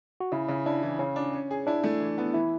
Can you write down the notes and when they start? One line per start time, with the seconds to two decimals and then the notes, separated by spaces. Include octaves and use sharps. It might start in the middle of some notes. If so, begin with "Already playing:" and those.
0.20 F#4
0.32 C#3 E4
0.48 C#3
0.66 D4 E4
0.83 E3
0.99 C#3 C#4
1.16 D4
1.33 C#4
1.51 G#4
1.67 D4 E4
1.84 A3
2.00 E3
2.18 B3
2.34 E3 E4